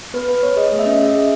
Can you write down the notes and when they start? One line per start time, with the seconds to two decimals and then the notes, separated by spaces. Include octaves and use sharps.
0.14 B3 B4
0.28 B3 B4
0.42 B3 C#5
0.56 G#4 D#5
0.72 A3
0.79 E5
0.86 C#4
0.93 D#5
1.00 G#4
1.06 E5
1.15 G#4